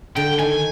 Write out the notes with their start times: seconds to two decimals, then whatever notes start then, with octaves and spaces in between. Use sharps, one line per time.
0.16 D3 G5
0.39 D#3 G#5